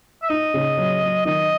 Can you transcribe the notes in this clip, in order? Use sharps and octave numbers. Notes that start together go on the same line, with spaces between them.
E5
D#4 D#5
C#3
F#3
F#3
D#3 D#5